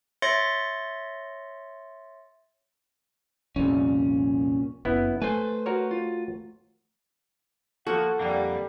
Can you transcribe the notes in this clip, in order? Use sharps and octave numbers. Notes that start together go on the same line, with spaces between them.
C#5 E5 C6 A6 A#6 C#7
C2 F2 A#2 C#4
F#1 B3 E4
A3 B4 C5 G#5
F#4 A#4 C#5
F4
F3 A#3 F#4 A4 F#5
F2 D3 G3 A#3